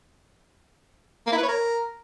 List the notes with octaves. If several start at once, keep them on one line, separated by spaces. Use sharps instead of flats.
A#3
E4
B4
C#5
A#4